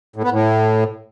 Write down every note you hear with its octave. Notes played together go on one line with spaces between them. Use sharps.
A2
B3
A2